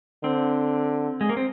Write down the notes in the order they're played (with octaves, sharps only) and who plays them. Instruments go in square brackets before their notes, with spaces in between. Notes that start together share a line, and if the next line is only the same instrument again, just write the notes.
[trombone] D3 [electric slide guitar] C4
[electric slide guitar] G#3
A#3
C4